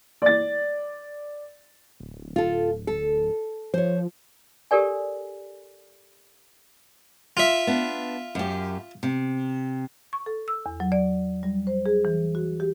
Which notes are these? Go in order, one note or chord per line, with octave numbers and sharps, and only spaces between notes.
D5 A6
D1
F4 A4
A4
F3 C5 C#5
G4 A4 A#4 D5 G#5
F4 E5
B3 D4
F#2 G4
C3
C#6
A4
E6
E2
F#3
D5
G3
C5
G#4
E3
F#4
G4